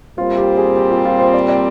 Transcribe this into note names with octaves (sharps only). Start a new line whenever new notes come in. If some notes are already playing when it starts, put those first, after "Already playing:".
A#2 G3 C4 F4
G4
G#4
G4
F4
F4
C5
D5
D5